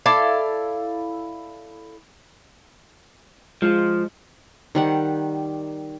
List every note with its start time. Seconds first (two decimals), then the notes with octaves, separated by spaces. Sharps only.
0.06 E4 A4 D5 F5
3.62 F3 G#3 F4
4.75 D#3 G3 F#5